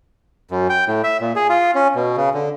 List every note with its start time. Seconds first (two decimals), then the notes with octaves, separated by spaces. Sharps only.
0.51 F#2
0.70 G5
0.88 A2
1.04 E5
1.21 A#2
1.36 G#4
1.49 F4
1.75 C#4
1.95 B2
2.17 C#3
2.34 D3